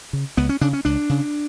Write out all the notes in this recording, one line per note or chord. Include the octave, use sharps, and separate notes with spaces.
C#3
C#2 B3
C#4
C#3 D4
C#4
C#2 D4
C#3